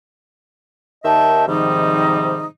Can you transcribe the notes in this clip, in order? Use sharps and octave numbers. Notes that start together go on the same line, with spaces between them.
D#2 D#3 D#5 E5 G5 A5
G#2 C3 D#3 F3 G3 D#4